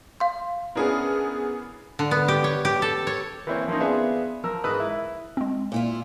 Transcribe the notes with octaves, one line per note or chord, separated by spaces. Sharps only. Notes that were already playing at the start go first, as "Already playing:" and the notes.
F5 C6
B3 C#4 D4 E4 G#4 A#4
D3
B3
G4
C#5
G4
A4
C#5
E3 A#3 C4 E4 C5 C#5
F3 A#3 C4 C#4 D#4
B3 D4 F4 G#4 E5
F3 A#4 E6
G#2 A#4 B4 B5 D#6 E6
E4
G#3 C4
A#2 E4 F4